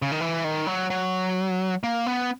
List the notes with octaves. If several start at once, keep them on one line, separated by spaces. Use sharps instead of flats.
C#3
D#3
E3
D#3
F#3
F#3
A#3
B3